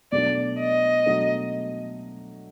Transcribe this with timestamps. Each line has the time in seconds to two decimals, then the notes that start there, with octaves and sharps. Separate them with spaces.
0.12 B2 F#3 A3 D4 D5
0.60 D#5
1.06 B2 F#3 A3 D4